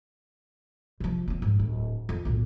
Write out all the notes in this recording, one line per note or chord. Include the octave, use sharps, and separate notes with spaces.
C3 F3
B3 C#4
G#2
D1
F2
B1 A2